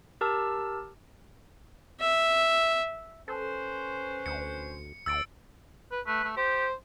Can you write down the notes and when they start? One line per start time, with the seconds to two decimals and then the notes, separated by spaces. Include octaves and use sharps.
0.21 G4 A#4 A5 E6
2.01 E5
3.28 C#4 A4 B4 C5
4.26 D2 C#7
5.06 D2 E6 A6 D7
5.92 B4
6.07 A3 B4
6.25 A3
6.37 G4 C5